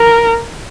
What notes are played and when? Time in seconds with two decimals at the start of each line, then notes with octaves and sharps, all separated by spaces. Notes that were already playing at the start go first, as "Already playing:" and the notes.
Already playing: A#4